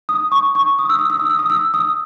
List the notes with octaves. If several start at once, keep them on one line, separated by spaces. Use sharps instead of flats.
D#6
C#6
C#6
D#6
E6
D#6
E6
D#6
E6
D#6
E6
D#6